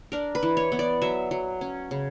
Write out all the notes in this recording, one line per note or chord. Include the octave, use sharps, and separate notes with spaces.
D4 A#4
B4
E3
C#5
B3
D5
F#3 E5
F#3
C#4
C#3